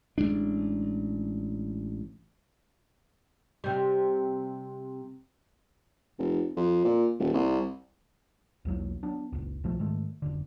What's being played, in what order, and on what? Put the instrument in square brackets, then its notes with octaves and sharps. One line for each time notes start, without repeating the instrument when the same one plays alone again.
[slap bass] A1 F#3 G#3 D4
[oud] C3 G3
[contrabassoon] F1
F2
A#2
D#1
C2
[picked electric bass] B1 E2 F#3 A#3
F#3 B3 D4
F#1 C#2
B1 F3 A3
G#2 D#3 G#3 A3
F1 A#1 D3